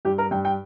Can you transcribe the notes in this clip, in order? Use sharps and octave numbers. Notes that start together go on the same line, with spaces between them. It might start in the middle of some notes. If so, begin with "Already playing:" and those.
G2 G4
A#4
G2 G5
G5